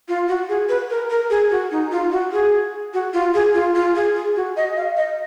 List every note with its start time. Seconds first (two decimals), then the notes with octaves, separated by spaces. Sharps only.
0.08 F4
0.28 F#4
0.49 G#4
0.69 B4
0.90 A#4
1.10 A#4
1.30 G#4
1.51 F#4
1.71 D#4
1.91 F4
2.12 F#4
2.32 G#4
2.94 F#4
3.13 F4
3.34 G#4
3.55 F4
3.75 F4
3.96 G#4
4.15 G#4
4.36 F#4
4.57 D#5
4.76 F5
4.97 D#5